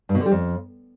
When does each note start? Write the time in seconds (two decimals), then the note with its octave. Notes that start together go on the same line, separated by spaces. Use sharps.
0.09 G2
0.15 B2
0.20 D3
0.26 G3
0.31 F2